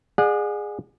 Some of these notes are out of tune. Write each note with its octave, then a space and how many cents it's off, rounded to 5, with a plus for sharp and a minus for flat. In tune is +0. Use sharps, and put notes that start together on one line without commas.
G#4 -5 D5 +45 F#5 -30